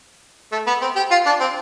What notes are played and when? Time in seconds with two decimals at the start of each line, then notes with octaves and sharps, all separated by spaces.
0.52 A3
0.67 B3
0.82 C4
0.96 G4
1.11 F4
1.26 D4
1.40 C4